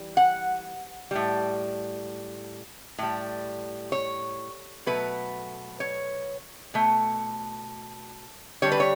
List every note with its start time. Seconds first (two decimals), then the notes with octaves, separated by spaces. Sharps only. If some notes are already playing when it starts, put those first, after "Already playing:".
Already playing: E3 G3
0.17 F#5
1.11 A2 G3
2.98 A2 G3
3.92 C#5
4.86 B2 F#3 A3 B4
5.80 C#5
6.74 B2 A3
8.62 D3 G3 C#5
8.72 B4
8.80 C#5